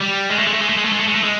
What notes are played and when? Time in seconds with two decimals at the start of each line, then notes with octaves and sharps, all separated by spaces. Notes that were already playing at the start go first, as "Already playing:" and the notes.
0.01 G3
0.30 G#3
0.39 A3
0.47 G#3
0.53 A3
0.61 G#3
0.69 A3
0.77 G#3
0.85 A3
0.93 G#3
1.00 A3
1.08 G#3
1.15 A3
1.24 G#3